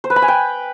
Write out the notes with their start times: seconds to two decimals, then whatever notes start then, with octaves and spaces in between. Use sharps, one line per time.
0.04 C5
0.10 B4
0.16 B5
0.22 G#5
0.28 G5